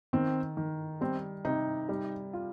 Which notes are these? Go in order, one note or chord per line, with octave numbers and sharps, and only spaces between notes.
D#3 C4
D#3
G3 C4
C3 D#4
G3
F4